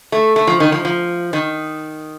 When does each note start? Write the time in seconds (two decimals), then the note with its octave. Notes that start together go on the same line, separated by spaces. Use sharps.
0.12 A3
0.36 A3
0.47 F3
0.60 D#3
0.72 F3
0.85 F3
1.33 D#3